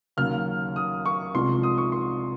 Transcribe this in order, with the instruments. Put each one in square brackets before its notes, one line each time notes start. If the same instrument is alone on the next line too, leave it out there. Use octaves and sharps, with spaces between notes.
[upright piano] D#2 C#3 F#3 F6
D#6
C#6
C2 C3 F3 G#3 C6
D#6
C#6
C6